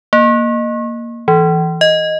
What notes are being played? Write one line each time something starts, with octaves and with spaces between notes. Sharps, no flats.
A#3
E3
D#5